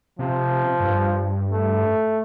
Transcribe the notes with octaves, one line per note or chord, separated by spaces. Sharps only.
C3 F3
G2
A3